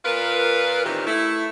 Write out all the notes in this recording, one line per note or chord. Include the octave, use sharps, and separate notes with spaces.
A#2 F4 A#4 B4
A#2 D#3 E3 C4 C#4 G4
A3 E4